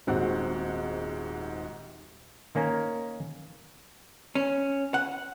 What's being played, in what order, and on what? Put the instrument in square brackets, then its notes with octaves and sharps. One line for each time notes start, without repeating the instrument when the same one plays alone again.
[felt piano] D#1 G#2 C4 F#4 F#5
[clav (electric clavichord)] D#3 A#3 C#4 A#4
[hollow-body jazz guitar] C#4
F#5